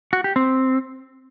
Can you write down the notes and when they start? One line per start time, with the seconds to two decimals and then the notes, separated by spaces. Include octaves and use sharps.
0.13 F#4
0.24 G4
0.36 C4